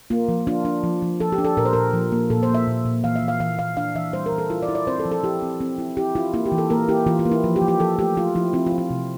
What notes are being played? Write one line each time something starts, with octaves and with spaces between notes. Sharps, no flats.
A#3 F4
F3
D4 F4
D4
F3
F3
F3 A4
G4
D4
A4
A#2 A#4
C5
A#2 A#4
F3
A#3
A#2 A4
C5
A#3
E5
A#2
A#2
E3 F5
E5
E3
F5
E3 F5
E3 F5
D4 F5
E3 E5
G3 C5
A#4
E3
A4
E4 F4
D5
E4
D5
C4 C5
A4
F3
A4
E4 G4
C4
C4
E4
E4 G4
E4 F4
A#3 E4
G4
E3
A4
A#3 A#4
E4 G4
E3 F4
F4
A#3
E4
F3
G4
F3
G4
F3 A4
A3 G4
F3 F4
F3 E4
C4 E4
F4
F3
F4
C3